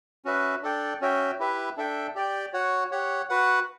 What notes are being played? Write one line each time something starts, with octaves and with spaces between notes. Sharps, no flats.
C#4 F#4 B4 E5
D4 A4 D5 G5
C#4 F#4 C#5 E5 G5
E4 G4 B4 E5
D4 A4 E5 G5
G4 D5 G5
F#4 C#5 F#5
G4 C#5 F#5
F#4 B4 F#5